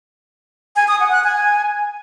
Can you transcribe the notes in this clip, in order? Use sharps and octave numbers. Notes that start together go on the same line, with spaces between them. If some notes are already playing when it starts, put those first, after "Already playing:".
G#5
D#6
F#5
F#6
G#5